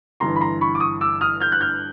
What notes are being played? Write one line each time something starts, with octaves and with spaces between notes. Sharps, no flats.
G1 G2 E3 A#5 C6
B5
A#5 C6
B5 C#6
D6
C#6 D#6
D6 E6
D#6 F6
F6 G6
F#6
F6 G6